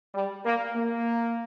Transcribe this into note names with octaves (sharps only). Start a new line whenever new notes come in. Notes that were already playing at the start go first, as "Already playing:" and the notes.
G3
A#3
A#3